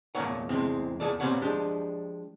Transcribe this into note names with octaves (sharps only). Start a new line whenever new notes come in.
E2 A#2 A3 A#3 C#5 F#5
E2 A2 C3 G#3 C4
E2 G#4 A4 D5
A#2 B3 C4 G4 C#5 F#5
F3 G#3 D4 G4